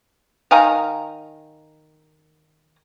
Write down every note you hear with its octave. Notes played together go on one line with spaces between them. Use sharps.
D#3 F5 G#5 A#5